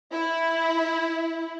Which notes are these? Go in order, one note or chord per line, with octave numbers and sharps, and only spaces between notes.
E4